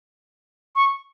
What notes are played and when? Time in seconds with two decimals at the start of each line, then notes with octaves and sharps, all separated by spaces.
0.76 C#6